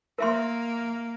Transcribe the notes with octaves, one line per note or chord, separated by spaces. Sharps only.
A#3 A#4 E5 C6